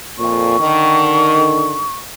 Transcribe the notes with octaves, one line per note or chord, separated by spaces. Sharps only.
F2 A#2 C#6
D3 D#3